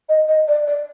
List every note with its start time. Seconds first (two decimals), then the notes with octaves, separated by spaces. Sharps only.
0.08 D#5
0.28 D#5
0.47 D5
0.67 D5